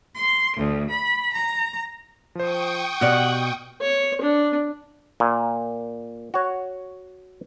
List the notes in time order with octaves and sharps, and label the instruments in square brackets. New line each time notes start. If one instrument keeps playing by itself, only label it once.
[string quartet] C6
D2
B5
A#5
[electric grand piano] F3 C5 [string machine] G5 C#6 D#6
[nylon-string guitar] B2 D5 [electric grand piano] G4 F6 [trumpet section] F#5
[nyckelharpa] C#5
D4
[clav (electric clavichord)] A#2
F#4 C#5